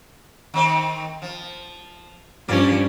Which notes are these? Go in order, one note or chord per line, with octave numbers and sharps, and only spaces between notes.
D#3 C4 D#4
F3
G2 F3 A#3 C4 C#4 D5